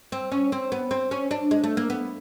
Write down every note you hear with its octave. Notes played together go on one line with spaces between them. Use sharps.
C4
C#4
C4
B3
C4
C#4
D4
G#3
A3
A#3
B3